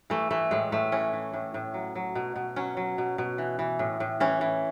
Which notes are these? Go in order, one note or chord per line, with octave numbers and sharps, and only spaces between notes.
E3 A3
E3 A3
A2 G#3
A2 A3
E3 C#4
E3
A2
A2
F#3
F#3
B2
B2
F#3 C#4
F#3
B2
B2
E3
E3
A2
A2
E3 C#4
E3